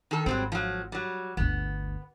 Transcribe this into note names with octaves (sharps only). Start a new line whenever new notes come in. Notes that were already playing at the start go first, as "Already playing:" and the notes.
D#3 A4
G#1 F#3 G3 C4
F3 F#3
F#3 G3
G1 D2 B3